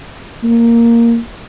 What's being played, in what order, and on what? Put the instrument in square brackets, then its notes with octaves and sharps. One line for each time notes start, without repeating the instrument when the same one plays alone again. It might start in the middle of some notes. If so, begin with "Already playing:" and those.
[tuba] A#3